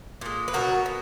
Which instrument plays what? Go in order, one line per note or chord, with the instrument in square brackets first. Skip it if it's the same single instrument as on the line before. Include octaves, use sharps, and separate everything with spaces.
[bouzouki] A#2 G#3
B4
B2 F#3 F#4 A#4
B2